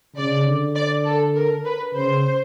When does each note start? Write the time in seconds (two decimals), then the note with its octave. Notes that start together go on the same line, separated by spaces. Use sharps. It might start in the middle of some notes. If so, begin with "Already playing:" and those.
0.16 C#3 D5
0.46 D3
0.75 D5
1.06 A4
1.35 A#4
1.65 B4
1.94 C#3 C5